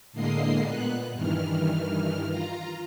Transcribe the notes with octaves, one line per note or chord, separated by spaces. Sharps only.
A2 D3 G#3 A#3 D#5 C7
A#2 B3 F#6
G2 D#3 E3 F6
F4 A#5